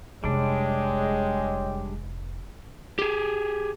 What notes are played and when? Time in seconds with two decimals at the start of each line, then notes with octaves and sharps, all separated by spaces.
0.24 F1 G3 G#3 D4 C#5 D#5 G5
2.99 G4 G#4